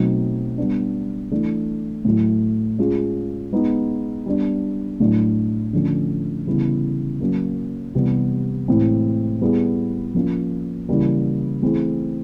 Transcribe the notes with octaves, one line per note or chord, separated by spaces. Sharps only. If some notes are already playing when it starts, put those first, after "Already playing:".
Already playing: B2 F#3 A3 C4 D#4
G3 B3 D4
E3 A3 D4
A2 F#3 A3
G#3 C#4 F4 G#4
G#3 B3 D#4
G3 B3 D4
A2 F#3 A3 D4
D3 F3 A3 C#4
C#3 E3 G3 B3 E4
F#3 A#3 C#4
C3 E3 G3 B3
A2 E3 G#3 C4 E4
G3 B3 E4 G#4
F3 A#3 C#4 F4
C#3 E3 G3 A#3 C#4
E3 A3 C4 E4 G#4